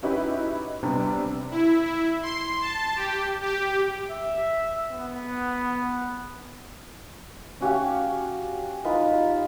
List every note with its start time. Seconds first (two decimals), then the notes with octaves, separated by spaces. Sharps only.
0.03 C#4 D#4 E4 F#4 G4 B4
0.83 C3 G3 B3 C4 D4
1.51 E4
1.85 E4
2.23 C6
2.62 A5
2.96 G4
3.42 G4
4.11 E5
4.91 B3
7.61 C#4 F#4 G4 F5
8.84 D#4 F4 B4